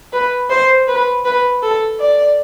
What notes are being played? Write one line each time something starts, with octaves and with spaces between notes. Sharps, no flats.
B4
C5
B4
B4
A4
D5